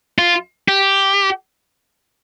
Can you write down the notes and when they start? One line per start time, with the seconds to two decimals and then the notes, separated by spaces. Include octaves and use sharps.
0.18 F4
0.68 G4